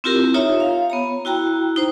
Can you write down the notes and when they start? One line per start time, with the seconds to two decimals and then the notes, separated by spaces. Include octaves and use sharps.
0.04 C4 E4 F4 G4 A#4
0.34 D#4 F4 C#5 E5 A#5
0.60 F5
0.90 B3 C#5 A#5
1.25 E4 F#4 G5 A#5
1.76 D#4 C5